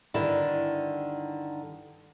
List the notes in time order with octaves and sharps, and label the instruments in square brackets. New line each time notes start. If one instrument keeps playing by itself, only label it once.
[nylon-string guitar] G2 D3 D#3 E4